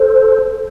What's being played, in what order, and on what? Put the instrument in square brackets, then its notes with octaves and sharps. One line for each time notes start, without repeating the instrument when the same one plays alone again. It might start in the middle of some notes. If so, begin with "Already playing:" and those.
Already playing: [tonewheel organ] A4 C5